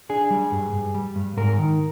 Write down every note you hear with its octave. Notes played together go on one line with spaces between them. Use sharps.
D4 G#4
G3
G2
G2
G3
G2
G#2 A#4
D#3